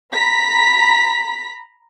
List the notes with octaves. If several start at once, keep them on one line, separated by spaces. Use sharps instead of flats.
A#5 B5 B6